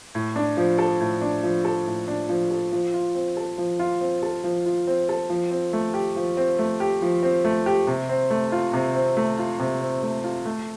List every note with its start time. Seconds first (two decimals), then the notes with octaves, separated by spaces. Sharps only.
0.15 A2
0.36 D4
0.57 F3
0.79 A4
1.01 A2
1.22 D4
1.43 F3
1.65 A4
1.86 A2
2.08 D4
2.29 F3
2.51 A4
2.72 F3
2.94 F4
3.15 C4
3.37 A4
3.58 F3
3.79 F4
4.01 C4
4.23 A4
4.44 F3
4.66 F4
4.87 C4
5.09 A4
5.29 F3
5.51 C4
5.73 A3
5.94 G4
6.16 F3
6.37 C4
6.59 A3
6.80 G4
7.02 F3
7.23 C4
7.45 A3
7.66 G4
7.87 C3
8.09 C4
8.30 A3
8.52 F4
8.73 C3
8.95 C4
9.17 A3
9.38 F4
9.59 C3
9.81 C4
10.03 A3
10.24 F4
10.45 A3